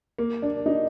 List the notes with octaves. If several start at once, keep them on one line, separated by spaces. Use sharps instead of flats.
A#3
D4
D#4